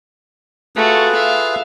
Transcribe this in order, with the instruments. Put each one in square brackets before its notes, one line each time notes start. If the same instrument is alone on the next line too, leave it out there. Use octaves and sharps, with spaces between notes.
[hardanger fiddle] A3 F#4 [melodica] F4 G#4 B4
[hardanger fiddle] E5 F5